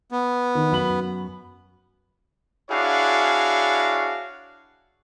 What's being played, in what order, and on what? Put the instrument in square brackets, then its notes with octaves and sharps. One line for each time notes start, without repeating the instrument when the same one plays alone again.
[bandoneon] B3
[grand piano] D#3
F#2 B5 F#7
[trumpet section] D4 E4 F#4 G#4 C#5 F5